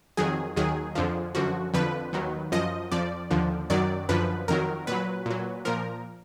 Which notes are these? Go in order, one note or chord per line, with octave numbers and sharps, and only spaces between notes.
F2 D#3 F#3 G#4
D#2 D#3 F#3 G#4
F2 D3 F3
F#2 D3 F3 F#4
F2 D3 F3 B4
D#2 D#3 F#3
F#2 F3 D#5
F2 F3 D5
D#2 D3 F3
F#2 D#3 F#3 D5
F#2 D3 F3 B4
F2 D#3 F#3 A#4
A#2 F#3 B4
A#2 F#3
A#2 F3 A#4